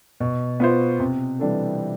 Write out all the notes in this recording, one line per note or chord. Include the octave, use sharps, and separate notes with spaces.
B2
B3 F4 C5
C3
E3 G3 D4 A4